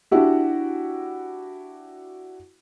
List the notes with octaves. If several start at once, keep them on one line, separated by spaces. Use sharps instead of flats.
D4 E4 F#4 G4